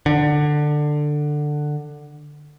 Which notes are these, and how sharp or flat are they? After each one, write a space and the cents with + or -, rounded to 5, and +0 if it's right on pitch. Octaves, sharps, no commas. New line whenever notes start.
D3 +15